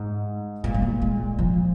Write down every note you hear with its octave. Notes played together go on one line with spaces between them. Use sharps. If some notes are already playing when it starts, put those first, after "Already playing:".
Already playing: G#2 G#3
A#2 G#3
G#3
A#3
G#3
F3